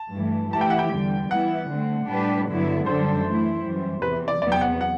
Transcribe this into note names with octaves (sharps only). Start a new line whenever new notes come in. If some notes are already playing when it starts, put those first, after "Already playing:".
Already playing: A5
G2 E3 A3
E3 A3 E4 G4 A5
G5
F#5
G5
E2 D3 G3
E3 G3 B3 E4 F#5
D3 A3 C4
A2 G3 D4 G4 B4
G2 D3 F#3 B3 E4
F#2 D3 G3 D4 A4 C5
E3 A3 E4
F#2 E3 G3
E2 C3 E3 B4
D5
E2 C3 F#3 B3 D5
G5
F#5
F#5